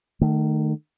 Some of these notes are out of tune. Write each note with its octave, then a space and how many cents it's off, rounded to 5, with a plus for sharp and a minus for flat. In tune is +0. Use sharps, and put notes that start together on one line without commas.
D#3 -25 A3 +0